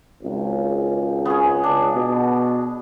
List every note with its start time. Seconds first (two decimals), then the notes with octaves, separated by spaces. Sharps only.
0.22 G#1 C#2
1.25 B3 C#4 G#4
1.64 C#2 D4
1.93 B2